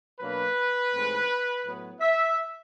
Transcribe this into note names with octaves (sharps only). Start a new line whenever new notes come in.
B2 F#3 A#3 D4 B4
G#2 E3 A3 C4
A2 F#3 B3
E5